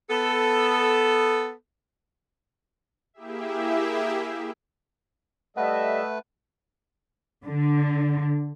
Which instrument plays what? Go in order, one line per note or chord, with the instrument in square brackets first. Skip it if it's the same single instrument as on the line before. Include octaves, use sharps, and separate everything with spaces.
[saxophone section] B3 A4
[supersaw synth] A#3 E4 G4 G#4 E5
[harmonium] G3 A4 [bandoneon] A3 B4 [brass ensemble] D#5 E5 [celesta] F#5
[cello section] D3